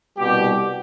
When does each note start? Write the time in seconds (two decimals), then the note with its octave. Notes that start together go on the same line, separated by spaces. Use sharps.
0.18 C2 B2 G3 G4